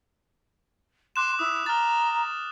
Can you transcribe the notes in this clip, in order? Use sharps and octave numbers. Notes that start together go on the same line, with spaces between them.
C6 D6 F#6 E7
E4 D#6
A#5 F6 A6